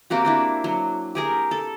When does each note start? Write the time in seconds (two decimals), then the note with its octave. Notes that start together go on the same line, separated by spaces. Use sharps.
0.10 A#3 C4 F#4 G4
0.25 C4 D4 E4
0.64 F#3
1.15 G4 G#4 A#4
1.51 A4